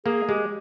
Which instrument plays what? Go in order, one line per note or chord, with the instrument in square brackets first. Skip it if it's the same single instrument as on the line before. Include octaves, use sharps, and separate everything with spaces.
[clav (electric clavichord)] A#3 [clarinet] G#4
[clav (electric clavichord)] G#3 [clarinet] G4